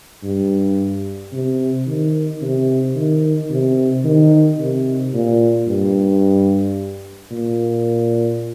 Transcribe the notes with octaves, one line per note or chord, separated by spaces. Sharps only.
G2
C3
D#3
C3
D#3
C3
D#3
C3
A#2
G2
A#2